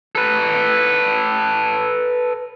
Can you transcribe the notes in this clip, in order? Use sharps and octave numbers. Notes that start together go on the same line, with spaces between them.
A4 B4